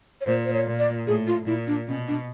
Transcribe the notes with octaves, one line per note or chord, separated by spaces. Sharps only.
C#5
A#2 C5
C5
C#5
A#2
D5
A2 G#4
F4
A#2 E4
D4
B2 C#4
D4